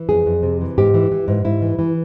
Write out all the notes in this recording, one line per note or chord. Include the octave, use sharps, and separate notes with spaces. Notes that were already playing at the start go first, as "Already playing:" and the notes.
Already playing: E3
F2 G#4
F2
C3
E3
G#2 G4
E3
E3
G#2
G#2 E4
E3
E3